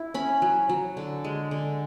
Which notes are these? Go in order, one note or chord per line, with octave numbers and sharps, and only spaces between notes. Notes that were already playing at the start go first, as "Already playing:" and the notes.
Already playing: E4
C#4 B5
F#3
F#3
D3
G#3
D3